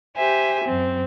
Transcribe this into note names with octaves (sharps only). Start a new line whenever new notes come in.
G4 C5 E5 G#5
F#2 C4